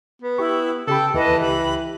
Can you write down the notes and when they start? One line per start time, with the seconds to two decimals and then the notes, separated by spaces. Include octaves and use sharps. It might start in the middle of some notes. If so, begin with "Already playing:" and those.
0.22 B3
0.38 E4 G4 C#6
0.87 C#3 G4 A4 G5 B5
1.14 D#2 E3 B4 D#5 A5
1.41 C#2 G4 B5 F#6